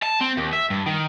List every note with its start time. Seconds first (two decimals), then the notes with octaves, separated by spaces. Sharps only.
0.03 A5
0.21 C4
0.37 D#2
0.53 E5
0.70 G2
0.86 D#3